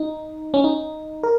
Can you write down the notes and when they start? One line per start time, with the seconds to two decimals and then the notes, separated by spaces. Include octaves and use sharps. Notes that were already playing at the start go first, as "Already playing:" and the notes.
Already playing: D#4
0.54 C#4
0.64 D#4
1.23 A#4